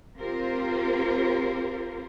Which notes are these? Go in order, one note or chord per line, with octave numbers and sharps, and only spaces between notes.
C4 F4 G4 A#4 C5